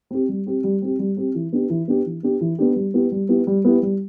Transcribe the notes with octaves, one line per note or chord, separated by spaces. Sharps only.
C4 G4
G3
C4 G4
G3
C4 G4
G3
C4 G4
E3
B3 D4 G4
E3
B3 D4 G4
E3
B3 D4 G4
E3
B3 D4 G4
G3
B3 E4 G4
G3
B3 E4 G4
G3
B3 E4 G4
G3